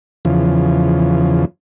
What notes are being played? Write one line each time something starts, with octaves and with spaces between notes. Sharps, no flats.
E2 C#3 F3